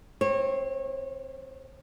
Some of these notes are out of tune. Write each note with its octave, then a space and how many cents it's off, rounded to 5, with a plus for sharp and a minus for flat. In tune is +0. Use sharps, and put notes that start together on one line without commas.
C4 +0 C#5 -30